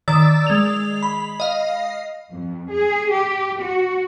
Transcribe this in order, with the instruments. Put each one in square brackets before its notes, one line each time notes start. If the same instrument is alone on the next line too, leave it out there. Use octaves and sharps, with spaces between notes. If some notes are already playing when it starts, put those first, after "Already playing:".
[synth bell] D#3 D5 E6 A6
G#3 F7
B5
D#5 F5
[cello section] F2
G#4
G4
F#4